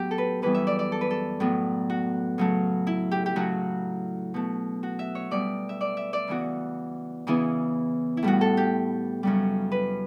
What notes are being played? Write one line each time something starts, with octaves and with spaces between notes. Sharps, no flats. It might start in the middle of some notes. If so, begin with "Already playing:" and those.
Already playing: A2 F#3 B3 G4
A4
B4
F#2 E3 G3 B3 B4
E5
D5
D5
A4
B4
A4
A2 F#3 B3
F#4
C#3 F#3 A3
E4
G4
G4
C#3 F#3 A3 F#4
B2 A3
F#4
E5
C#5
B2 G3 B3 D5
E5
D5
E5
D5
C#3 E3 B3 F#4
C#3 E3 B3 E4
E4
A2 G3 B3 F#4
A4
G4
F#2 C#3 G3
B4